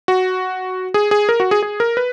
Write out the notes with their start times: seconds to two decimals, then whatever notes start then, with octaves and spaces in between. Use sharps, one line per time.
0.08 F#4
0.94 G#4
1.11 G#4
1.29 A#4
1.40 F#4
1.51 G#4
1.63 G#4
1.80 A#4
1.97 B4